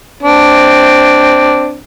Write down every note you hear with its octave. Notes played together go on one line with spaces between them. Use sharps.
C4 D4